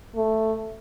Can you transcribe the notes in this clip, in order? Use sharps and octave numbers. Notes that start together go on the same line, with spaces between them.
A3